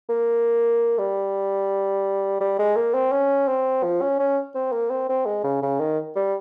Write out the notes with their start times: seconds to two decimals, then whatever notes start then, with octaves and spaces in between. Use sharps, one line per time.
0.09 A#3
0.99 G3
2.41 G3
2.59 G#3
2.76 A#3
2.94 C4
3.12 C#4
3.48 C4
3.83 F3
4.01 C#4
4.20 C#4
4.55 C4
4.72 A#3
4.90 C4
5.09 C4
5.26 G#3
5.44 C#3
5.63 C#3
5.79 D#3
6.16 G3